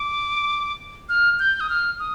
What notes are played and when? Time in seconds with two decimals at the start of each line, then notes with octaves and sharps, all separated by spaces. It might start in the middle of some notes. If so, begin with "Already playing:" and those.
Already playing: D6
1.09 F6
1.39 G6
1.60 D#6
1.69 F6
1.99 D#6